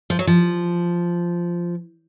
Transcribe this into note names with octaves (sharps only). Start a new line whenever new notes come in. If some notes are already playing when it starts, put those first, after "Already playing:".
F3
F#3
F3